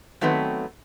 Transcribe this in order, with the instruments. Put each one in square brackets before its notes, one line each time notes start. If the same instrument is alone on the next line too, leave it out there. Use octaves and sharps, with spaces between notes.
[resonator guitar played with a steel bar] D#3 F#3 A3 B3 C4